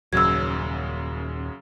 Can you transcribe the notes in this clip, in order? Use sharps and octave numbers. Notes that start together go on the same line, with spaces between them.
D#1 F#2 C#3 F#3 E6 G#6